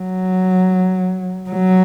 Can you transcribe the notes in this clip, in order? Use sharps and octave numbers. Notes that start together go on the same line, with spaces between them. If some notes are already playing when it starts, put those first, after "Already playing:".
Already playing: F#3
F#3